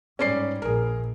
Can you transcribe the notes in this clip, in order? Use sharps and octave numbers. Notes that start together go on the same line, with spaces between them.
G#2 G3 C#4 D5 C7
A#1 G#4 A#4